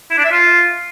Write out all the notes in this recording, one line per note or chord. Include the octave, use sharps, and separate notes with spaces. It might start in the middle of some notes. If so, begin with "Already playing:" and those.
E4
D4
E5
F4